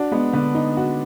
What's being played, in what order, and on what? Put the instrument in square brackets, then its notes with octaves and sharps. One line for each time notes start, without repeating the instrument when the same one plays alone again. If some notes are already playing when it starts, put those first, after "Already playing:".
Already playing: [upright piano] D4 [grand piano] F#4
[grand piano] G#3 [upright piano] B3
[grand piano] D3 [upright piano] B3
[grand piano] D#4
F#4